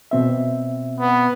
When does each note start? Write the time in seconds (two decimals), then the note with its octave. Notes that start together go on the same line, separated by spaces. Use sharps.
0.11 B2 C4 E5
1.00 B3